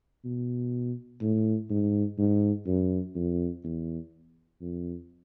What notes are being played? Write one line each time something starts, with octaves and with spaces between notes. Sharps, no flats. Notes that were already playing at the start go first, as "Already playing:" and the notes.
B2
A2
G#2
G#2
F#2
F2
E2
F2